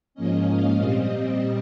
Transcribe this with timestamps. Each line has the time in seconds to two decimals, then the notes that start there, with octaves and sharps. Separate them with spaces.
0.15 G#2 F3 A#3 C#4 D#5
0.46 F5
0.78 A#2 G3 C4 D#5